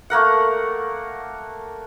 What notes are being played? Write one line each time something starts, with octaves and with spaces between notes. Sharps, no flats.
A3 A#3 A#4 F#5